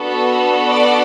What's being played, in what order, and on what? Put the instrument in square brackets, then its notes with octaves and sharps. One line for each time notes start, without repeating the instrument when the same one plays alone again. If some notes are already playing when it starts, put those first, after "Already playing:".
Already playing: [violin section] B3 D4 F#4 A4
D5